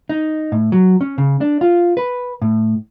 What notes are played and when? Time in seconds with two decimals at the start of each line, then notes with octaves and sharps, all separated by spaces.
0.09 D#4
0.52 A2
0.72 F#3
1.01 C#4
1.18 C#3
1.41 D4
1.61 F4
1.97 B4
2.42 A2